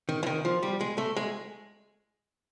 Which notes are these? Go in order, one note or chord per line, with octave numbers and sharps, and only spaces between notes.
D#3
E3
D#3
F3
G3
G#3
A3
G#3